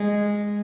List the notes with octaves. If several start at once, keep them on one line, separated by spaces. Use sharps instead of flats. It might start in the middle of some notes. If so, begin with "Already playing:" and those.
Already playing: G#3